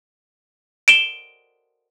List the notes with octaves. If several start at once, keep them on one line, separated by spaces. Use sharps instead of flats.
D7 E7 G7